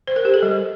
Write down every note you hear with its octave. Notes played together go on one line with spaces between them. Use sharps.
C5
A#4
G4
A4
G3